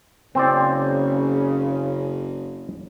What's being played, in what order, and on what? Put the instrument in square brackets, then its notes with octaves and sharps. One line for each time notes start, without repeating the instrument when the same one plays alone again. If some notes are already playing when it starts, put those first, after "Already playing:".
[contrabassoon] F#1 [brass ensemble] C#3 [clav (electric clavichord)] C4 C5 D5